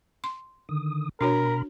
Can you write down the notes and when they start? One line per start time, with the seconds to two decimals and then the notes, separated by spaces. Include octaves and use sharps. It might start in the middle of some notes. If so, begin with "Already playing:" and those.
0.24 C6
0.69 D3 D#3 D#6
1.21 B2 D4 F#4 A#4 C#5 B5